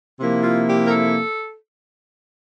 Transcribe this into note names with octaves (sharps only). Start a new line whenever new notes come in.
C3 F3 A#3 E4
F4
G4
A#4
A4